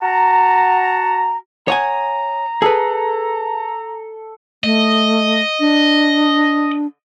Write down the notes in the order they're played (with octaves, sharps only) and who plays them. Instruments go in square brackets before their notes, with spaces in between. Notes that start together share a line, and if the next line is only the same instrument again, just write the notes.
[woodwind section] F#4 F#5 A5 A#5
[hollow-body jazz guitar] C#5 F#5 G#5 [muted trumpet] A#5 [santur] D#6
[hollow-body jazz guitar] G#4 B4 [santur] A4
[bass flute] A3 [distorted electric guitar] D#5
[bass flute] D4